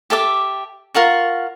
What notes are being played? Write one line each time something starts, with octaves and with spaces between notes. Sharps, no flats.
G4 A4 E5 D6
F4 A#4 F#5 C#6